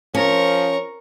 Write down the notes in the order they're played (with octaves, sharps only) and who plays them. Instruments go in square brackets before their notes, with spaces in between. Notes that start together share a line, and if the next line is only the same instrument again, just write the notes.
[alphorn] F3 [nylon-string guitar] C#4 [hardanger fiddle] A#4 C#6